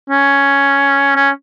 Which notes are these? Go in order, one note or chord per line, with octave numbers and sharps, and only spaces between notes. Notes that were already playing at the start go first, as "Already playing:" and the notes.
C#4
C#4